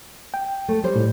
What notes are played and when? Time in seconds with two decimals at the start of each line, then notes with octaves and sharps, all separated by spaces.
0.34 G5
0.68 A3
0.84 G3 C5
0.96 A2